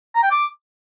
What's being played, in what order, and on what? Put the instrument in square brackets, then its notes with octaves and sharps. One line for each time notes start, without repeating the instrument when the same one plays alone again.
[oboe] A#5
G5
D6